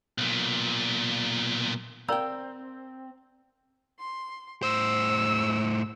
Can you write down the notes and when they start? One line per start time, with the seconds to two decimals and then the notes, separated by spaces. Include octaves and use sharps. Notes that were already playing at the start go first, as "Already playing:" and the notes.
0.18 B1 A#2
2.09 C4 A#4 D5 F5 G5 A#5 E6 G6
4.00 C6
4.63 A2 C5 E6